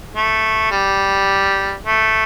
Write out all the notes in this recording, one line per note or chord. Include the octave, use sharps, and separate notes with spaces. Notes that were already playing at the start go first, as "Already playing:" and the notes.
A3
G3
A3